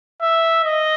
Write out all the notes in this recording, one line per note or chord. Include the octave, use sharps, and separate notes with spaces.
E5
D#5